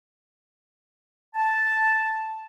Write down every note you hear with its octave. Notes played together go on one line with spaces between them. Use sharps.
A5